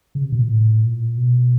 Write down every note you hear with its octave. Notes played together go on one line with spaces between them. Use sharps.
C#3
C3
B2
A#2
A2
A#2
B2